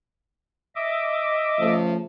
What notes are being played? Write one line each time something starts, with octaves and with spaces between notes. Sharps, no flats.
D#5 E5 D6
C#3 F3 A3